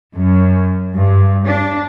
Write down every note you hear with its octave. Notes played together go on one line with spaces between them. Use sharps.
F#2
G2
D4